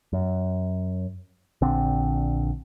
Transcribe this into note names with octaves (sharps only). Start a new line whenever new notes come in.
F#2
A#1 D3 C4